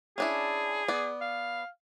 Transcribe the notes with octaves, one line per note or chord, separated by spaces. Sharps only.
C#4 D4 E4 G#4
B3 D5
F5